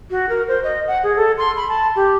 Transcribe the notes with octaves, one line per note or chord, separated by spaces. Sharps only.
F#4
A#4
C5
D#5
F#5
G#4
A4
C6
B5
A5
G4